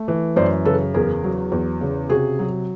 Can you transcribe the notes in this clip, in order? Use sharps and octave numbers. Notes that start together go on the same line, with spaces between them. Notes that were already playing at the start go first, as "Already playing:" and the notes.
Already playing: A3
E3
F#2 C5 D5
C#3 A4 B4
E2 G#4 A#4
F#3
E2
C#3
C3 F#4 G#4
F#3